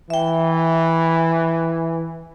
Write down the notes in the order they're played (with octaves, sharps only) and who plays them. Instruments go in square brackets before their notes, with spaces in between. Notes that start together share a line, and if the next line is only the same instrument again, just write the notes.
[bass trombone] E3 [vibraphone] E5 G5